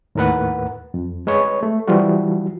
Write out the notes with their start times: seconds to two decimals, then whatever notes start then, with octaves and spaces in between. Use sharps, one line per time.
0.15 D#2 A2 A#4 B4 F#5
0.94 F2
1.27 G#3 B4 C#5
1.63 A3
1.88 E3 F3 G3 F4 F#4